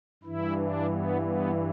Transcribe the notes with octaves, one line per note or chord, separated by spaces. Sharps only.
G2 E3 E4
D4
B3
B3